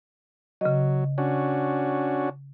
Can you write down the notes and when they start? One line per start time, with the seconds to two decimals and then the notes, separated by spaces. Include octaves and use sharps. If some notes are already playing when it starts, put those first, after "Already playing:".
0.61 C#3 F#3 D#5
1.18 C#4 D4 F#4